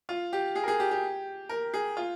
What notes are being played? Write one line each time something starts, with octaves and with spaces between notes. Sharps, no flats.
F4
G4
G#4
A#4
G#4
G4
G4
A#4
G#4
F4